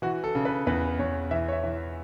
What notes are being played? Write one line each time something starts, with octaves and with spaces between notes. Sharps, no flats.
E3 F#4
A4
C#3
B4
E2 B4
E2 C#5
E3 E5
C#5
E5
E3